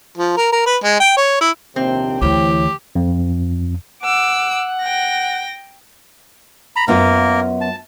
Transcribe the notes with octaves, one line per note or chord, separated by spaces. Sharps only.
F3
A#4
A#4
B4
G#3
G5
C#5
E4
A#1 D#2 C3 C4
D2 E3 E4 G4 C#5
F2
F#5 D6 E6
G5 A#6
A#5 B5
F#2 A#3 B3 F4 A#4
A5